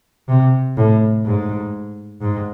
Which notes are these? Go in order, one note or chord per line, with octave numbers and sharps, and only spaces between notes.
C3
A2
G#2
G#2